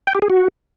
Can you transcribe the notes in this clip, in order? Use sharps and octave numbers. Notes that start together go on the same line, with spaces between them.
G5
G4
G#4
F#4